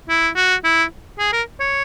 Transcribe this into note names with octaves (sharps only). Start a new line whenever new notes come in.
E4
F#4
E4
G#4
A#4
C#5